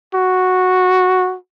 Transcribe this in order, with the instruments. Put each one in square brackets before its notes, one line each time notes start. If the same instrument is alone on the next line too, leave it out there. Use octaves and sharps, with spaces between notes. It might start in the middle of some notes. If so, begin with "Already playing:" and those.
[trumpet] F#4